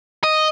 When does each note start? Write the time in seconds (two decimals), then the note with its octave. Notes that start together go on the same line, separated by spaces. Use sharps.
0.24 D#5